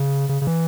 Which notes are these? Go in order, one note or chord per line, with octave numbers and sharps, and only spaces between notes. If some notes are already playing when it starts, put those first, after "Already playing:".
Already playing: C#3
C#3
C#3
E3